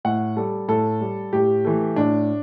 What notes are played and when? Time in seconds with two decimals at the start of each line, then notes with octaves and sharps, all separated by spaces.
0.05 A2 F#5
0.37 G3 A4
0.68 A2 A4
1.01 G3
1.33 A2 G4
1.65 E3 A3
1.96 A2 D4